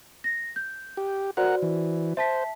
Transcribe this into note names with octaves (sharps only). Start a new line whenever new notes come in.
A#6
G6
G4
F#4 A#4 C5 D5 F#5
E3
C5 E5 A5 B6